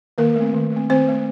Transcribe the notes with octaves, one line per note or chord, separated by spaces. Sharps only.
D#3 A#3 A#4
A3 C4
D#3
A3 C4
D#3 C4 C5
A3 C4